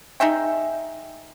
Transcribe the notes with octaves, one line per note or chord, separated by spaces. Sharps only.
D#4 G#4 E5 G5